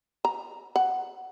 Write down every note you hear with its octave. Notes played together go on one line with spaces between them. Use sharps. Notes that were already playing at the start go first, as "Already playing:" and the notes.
A#5
F#5